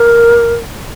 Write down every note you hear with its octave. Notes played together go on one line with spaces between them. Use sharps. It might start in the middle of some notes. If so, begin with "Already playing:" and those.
Already playing: A#4